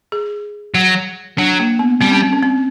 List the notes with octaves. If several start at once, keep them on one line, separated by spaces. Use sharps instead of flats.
G#4
F#3
F#3 D4
A#3
B3
G3 C4
C#4
C4
C#4
C4